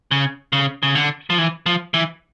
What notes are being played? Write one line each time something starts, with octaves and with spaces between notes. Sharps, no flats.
C#3
C#3
C#3
D3
F3
E3
F3
E3